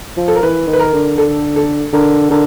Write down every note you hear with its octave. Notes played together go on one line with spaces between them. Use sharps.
F3
A4
A#4
E3 B4
D#3
B4
A#4
D3
D3 A4
A4
D3 A#4
D3 A#4